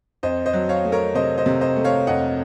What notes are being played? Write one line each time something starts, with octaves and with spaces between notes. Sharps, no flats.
F2 C5 D#5
C5 D#5
F#3
C#5 F5
A3
A#4 C#5
C3 C5 D#5
C5 D#5
C3
C5 D#5
A3
C#5 F5
F2 D#5 F#5